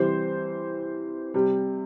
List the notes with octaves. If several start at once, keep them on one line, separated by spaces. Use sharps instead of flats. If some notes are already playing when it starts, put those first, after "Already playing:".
Already playing: C3 E3 G3 C5
C3 G3